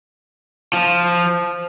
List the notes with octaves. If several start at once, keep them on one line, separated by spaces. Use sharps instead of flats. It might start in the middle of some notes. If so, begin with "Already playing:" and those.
F3